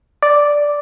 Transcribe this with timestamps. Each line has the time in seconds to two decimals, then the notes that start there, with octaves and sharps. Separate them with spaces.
0.22 D5